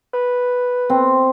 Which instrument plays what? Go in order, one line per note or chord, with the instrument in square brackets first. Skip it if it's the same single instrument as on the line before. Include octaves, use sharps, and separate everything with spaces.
[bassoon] B4
[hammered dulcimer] C4